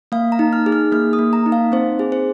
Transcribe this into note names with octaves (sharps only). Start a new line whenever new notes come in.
A#3 F5
A#5
D#4
F6
G#4
F6
A#3 F6
D#6
A#3
A#5
D#4
F5
C4 C5
G#4
C5